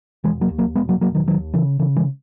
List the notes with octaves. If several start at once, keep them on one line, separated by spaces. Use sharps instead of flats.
E1 E3 G#3
F#3 A#3
D#2
F#3 A#3
E1 G#3 B3
F#3 A#3
E1 F#3 A#3
D#3 F#3
D#2 D#3 F#3
C#3 E3
C#3 E3
E3 G#3